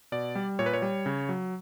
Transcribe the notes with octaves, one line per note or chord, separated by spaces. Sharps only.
B2 D5
G3
A#2 C#5
B4
C#5
G3
C#3
F#3